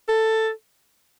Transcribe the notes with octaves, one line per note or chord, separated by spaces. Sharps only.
A4